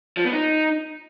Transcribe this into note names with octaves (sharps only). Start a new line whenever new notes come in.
F3
B3
D#4